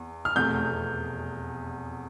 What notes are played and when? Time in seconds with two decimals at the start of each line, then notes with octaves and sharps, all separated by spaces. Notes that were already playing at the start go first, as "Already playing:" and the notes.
Already playing: E2
0.25 F6
0.36 F1 E2 B2 A3 G6